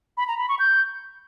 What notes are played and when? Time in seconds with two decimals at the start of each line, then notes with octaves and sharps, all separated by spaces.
0.17 B5
0.28 A#5
0.38 B5
0.49 C#6
0.59 G6